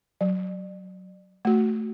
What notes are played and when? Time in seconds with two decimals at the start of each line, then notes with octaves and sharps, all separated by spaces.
0.21 F#3
1.45 A3 F#4